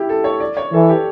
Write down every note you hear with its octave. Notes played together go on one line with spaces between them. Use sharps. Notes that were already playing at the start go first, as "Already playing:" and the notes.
Already playing: E4 G4
A4
C#5
D5
C#5
E3 A4
G4